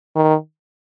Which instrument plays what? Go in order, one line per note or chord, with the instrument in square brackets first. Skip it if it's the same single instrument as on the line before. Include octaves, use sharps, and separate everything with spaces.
[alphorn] D#3